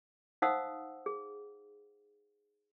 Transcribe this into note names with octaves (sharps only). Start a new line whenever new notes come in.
D#4 C5 F5 F#5 D#6 E6
G#4